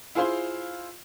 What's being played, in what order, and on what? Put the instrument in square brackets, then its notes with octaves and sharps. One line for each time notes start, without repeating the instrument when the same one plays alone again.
[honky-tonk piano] E4 F4 G#4 C5 F5 C6